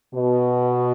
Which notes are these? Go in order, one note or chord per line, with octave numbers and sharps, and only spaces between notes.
B2